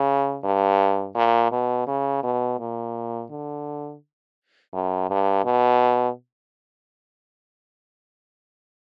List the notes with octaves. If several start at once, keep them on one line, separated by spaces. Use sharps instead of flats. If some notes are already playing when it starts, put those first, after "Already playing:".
Already playing: C#3
G2
A#2
B2
C#3
B2
A#2
D3
F#2
G2
B2